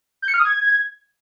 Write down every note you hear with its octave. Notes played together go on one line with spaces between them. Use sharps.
G6
C#7
F6
D#6
G#6